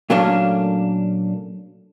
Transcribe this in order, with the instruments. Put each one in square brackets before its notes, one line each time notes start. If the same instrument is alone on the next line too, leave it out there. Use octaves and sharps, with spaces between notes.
[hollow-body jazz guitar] A#2 F#3 A3 A#3 C#4 D4